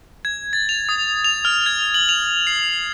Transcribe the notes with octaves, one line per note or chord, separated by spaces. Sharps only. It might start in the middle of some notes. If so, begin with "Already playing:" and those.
G#6
A6
F7
D#6
F7
F6
G#6
F#7
F7
C7